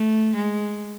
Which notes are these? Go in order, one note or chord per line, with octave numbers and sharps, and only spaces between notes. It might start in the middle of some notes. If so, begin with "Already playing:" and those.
Already playing: A3
G#3